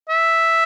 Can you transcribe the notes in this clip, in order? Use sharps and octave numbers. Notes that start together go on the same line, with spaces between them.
E5